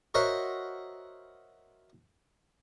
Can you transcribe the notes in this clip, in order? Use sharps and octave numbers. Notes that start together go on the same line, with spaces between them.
F#4 A#4 C5 C#5 D#5 E5